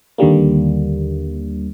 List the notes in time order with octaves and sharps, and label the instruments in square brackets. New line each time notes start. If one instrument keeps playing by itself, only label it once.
[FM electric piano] D#2 D3 G3 A#3